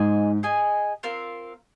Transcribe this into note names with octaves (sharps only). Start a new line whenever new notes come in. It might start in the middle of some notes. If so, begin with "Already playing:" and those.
Already playing: G#2 G#4 D#5 G#5
G#4 D#5 G#5
C4 F4 A#4 F5